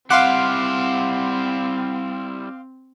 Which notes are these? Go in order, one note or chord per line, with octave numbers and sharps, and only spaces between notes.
G3 C4 E4 F5 F#5 C6 D6